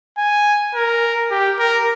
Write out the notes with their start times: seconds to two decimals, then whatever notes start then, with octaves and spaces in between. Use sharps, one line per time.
0.18 G#5
0.74 A#4
1.31 G4
1.59 A#4